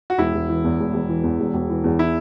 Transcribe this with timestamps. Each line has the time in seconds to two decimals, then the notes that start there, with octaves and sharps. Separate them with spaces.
0.10 F#4
0.18 E1 E4
0.34 E1
0.49 E3
0.64 E2
0.79 E1
0.93 E1
1.09 E3
1.23 E2
1.39 E1
1.54 E1
1.70 E3
1.84 E2
1.99 E4